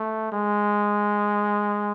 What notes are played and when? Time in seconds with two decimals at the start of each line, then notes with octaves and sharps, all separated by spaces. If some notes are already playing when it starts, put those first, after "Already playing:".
Already playing: A3
0.32 G#3